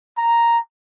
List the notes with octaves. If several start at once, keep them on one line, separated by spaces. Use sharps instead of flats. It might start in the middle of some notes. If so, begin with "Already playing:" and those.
A#5